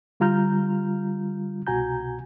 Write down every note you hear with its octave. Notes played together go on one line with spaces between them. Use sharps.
D3 G3 F4 A#5 F6 G6
C2 B2 F#4 G#5 A#5 G6